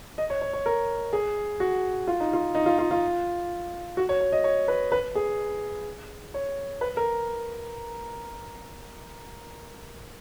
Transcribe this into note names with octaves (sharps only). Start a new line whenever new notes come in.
D#5
C#5
C#5
C#5
A#4
G#4
F#4
F4
D#4
F4
D#4
F4
F4
F4
F#4
C#5
C#5
D#5
C#5
B4
B4
G#4
C#5
B4
A#4